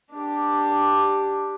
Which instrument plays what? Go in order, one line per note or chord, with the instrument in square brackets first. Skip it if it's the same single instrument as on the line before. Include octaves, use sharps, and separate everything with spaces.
[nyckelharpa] D4 G4